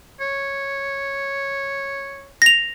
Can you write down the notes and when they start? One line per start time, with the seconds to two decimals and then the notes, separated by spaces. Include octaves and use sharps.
0.21 C#5
2.42 A#6 F7